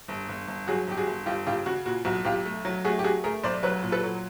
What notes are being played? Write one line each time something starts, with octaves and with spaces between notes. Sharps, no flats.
G1
G1
G1
F#3 F#4 G#4
G1 G4
F#4 G#4
G1
G1 F4 G4
C#3 F4 G4
C#3 F#4
A#2 F#4
B1 F#4
B1 F4 G4
A3
F#3
A3 F#4 G#4
G4
A3 F#4 G#4
A3 G#4 A#4
B1 C5 D5
F#3 B4 C#5
A#2
A4 B4
F#3